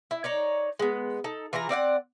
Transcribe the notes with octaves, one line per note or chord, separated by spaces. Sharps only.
E4
D#4 C#5 D5
G#3 B3
D#4 A4
E3 F4 G#4 A#5
C4 D5 E5 F#5